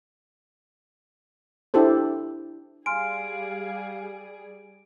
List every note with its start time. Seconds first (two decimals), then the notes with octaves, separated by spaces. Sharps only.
1.74 D4 E4 G4 A4 C5
2.86 G3 G#4 F5 G#5 C6 F6 D7